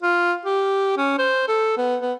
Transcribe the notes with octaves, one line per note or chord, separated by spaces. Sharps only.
F4
G4
C#4
C5
A4
B3
B3